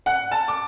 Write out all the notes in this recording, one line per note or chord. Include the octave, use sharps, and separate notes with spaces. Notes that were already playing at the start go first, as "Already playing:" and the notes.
F#5
A5
D6